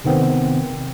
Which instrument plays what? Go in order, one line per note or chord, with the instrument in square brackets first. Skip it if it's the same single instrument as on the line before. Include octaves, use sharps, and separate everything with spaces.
[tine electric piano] C3 D#3 B3 C4